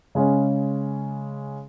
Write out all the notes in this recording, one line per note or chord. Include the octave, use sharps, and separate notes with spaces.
C#3 G#3 C#4